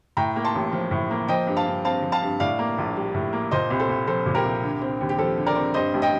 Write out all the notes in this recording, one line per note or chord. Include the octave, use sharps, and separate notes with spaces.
A2 G5 A#5
A#3
A5 C6
A1
F3
A2
A#3
F3 D#5 G5
G2
F5 A5
G2
C4 F5 A5
F3
F5 A5
G2
A2 D5 F5
A#3
A#1
G3
A2
A#3
A#2 C5 D#5
C2
A4 C5
C2
F3 A4 C5
A#2
G4 A#4
C2
D3
C4
D#2
G4
F3 A4
D3
A#4 D5
C4
G2 C5 D#5
A1
D#5 G5